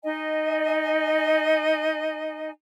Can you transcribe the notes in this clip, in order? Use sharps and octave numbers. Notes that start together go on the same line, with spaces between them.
D#4 D#5 G#5